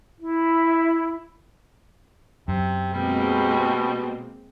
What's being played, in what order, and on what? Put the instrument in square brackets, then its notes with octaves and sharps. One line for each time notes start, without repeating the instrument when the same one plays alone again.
[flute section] E4
[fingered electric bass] F#2 [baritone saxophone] C3
[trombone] B2 [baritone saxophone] G3 [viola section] G#3 A#3 C4